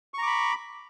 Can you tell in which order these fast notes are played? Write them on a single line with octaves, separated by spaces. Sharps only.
C#6 A#5 D6 B5